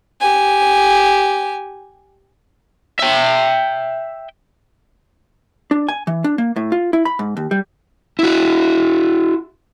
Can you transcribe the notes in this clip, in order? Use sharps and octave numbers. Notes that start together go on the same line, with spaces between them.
G4 G#5
E5 G5
D4
G#5
E3
D4
A#3
A2
F4
E4
B5
G#2
D#2
G3
E4 F#4